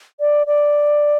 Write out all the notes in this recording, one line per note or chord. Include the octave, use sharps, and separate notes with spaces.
D5
D5